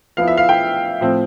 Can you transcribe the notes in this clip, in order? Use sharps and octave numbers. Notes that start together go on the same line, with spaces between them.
F3 B3 E4 F5
E5
F5
G5
A2 F3 C4